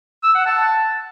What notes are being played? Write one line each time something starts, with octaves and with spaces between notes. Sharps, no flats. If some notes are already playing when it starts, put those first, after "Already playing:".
E6
F#5
A5